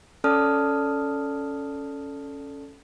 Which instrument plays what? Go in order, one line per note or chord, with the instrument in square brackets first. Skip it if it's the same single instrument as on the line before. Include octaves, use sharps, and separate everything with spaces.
[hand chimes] C#4 A4 D5 A5 D#6 F6